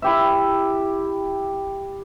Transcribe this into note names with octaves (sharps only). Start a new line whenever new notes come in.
E4 G4 E5